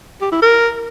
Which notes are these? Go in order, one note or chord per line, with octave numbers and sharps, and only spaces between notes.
G4
E4
A#4